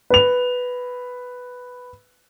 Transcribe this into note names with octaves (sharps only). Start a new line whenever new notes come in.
B4 F7